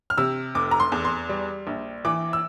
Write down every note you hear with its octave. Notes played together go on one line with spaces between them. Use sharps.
F6
C3 E6
F1 D6
A#5
C6
E2
C6
G3
A#1
E3 D6
E6